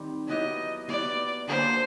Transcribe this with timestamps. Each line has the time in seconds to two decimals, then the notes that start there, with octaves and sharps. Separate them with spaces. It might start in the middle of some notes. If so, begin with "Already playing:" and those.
Already playing: D#3 G3 C4
0.28 F#3 B3 E4 G4 D#5
0.88 F#3 B3 E4 G4 D5
1.48 D3 F#3 A#3 C5